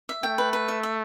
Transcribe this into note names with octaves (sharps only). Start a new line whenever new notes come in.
E5
A3 G5
B4
B4
E5
E5